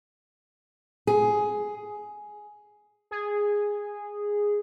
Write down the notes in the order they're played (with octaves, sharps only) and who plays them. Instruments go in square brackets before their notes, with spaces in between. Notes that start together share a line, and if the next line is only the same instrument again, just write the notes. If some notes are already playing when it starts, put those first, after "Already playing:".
[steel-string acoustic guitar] G#4
[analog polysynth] G#4